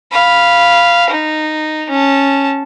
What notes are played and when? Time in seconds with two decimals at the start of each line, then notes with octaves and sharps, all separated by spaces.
0.12 F5 B5
1.11 D#4
1.90 C#4 A5